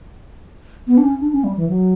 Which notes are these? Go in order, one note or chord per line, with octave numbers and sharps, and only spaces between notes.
B3
D4
C#4
D4
C#4
G3
E3
F#3